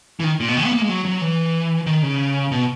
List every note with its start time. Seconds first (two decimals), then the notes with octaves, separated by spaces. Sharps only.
0.20 E3
0.24 D#3
0.40 A#2
0.48 B2
0.57 D#3
0.65 B3
0.73 A#3
0.81 G#3
0.89 F#3
1.05 F#3
1.21 E3
1.86 D#3
2.02 C#3
2.52 B2